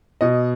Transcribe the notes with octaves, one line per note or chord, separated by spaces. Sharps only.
B2 D#5